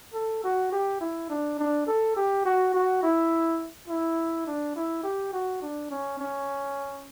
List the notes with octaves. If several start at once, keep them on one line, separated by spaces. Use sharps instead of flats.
A4
F#4
G4
E4
D4
D4
A4
G4
F#4
F#4
E4
E4
D4
E4
G4
F#4
D4
C#4
C#4